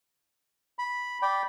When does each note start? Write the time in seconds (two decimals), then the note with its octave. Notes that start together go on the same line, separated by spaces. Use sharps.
0.79 B5
1.22 D5 G5 B5